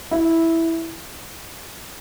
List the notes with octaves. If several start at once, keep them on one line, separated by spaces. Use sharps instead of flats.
E4